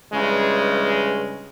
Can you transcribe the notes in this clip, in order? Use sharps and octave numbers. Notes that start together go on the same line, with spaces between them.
G2 C#3 E3 G#3